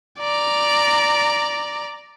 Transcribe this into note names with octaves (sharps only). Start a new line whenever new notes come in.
D5 A#5